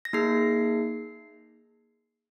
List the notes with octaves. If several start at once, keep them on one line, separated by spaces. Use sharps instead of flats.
A#6
A#3 D#4 G#4 C7